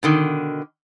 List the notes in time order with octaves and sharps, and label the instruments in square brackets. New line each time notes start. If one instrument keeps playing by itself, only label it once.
[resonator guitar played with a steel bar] B2 D3 D#3